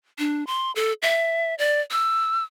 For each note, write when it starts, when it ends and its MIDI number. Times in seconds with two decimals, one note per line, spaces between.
0.19 0.44 62
0.47 0.72 84
0.76 0.93 69
1.02 1.55 76
1.59 1.81 74
1.91 2.44 88